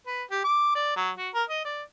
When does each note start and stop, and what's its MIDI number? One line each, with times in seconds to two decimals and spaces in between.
0.07 0.23 71
0.31 0.40 67
0.44 0.73 86
0.75 0.93 74
0.97 1.10 54
1.18 1.29 66
1.35 1.44 70
1.50 1.64 75
1.65 1.83 74